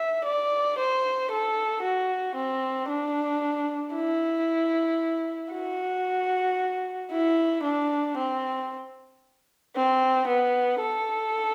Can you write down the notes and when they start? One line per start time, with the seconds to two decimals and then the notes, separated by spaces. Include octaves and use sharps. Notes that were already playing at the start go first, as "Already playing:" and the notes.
Already playing: E5
0.25 D5
0.79 C5
1.31 A4
1.83 F#4
2.36 C4
2.89 D4
3.94 E4
5.53 F#4
7.11 E4
7.64 D4
8.18 C4
9.76 C4
10.28 B3
10.81 A4